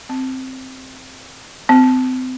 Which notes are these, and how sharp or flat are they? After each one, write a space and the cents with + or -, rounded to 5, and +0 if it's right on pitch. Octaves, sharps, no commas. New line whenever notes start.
C4 +0
C4 -30